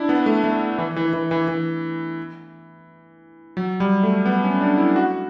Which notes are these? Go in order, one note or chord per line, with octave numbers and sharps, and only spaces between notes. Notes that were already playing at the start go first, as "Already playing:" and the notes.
Already playing: D4 E4
B3
A3
A3
E3
E3
E3
E3
E3
F#3
G3
A3
B3
C#4
D4
E4
F#4